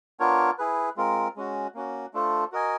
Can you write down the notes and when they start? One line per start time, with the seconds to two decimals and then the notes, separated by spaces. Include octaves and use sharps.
0.20 B3 D4 F4 A#4 C#5
0.58 E4 G#4 B4
0.97 G#3 C4 F4 A#4
1.36 G#3 C#4 F#4
1.74 A#3 C#4 F#4
2.14 A3 D4 F4 A4 C5
2.52 F#4 A#4 D#5 G#5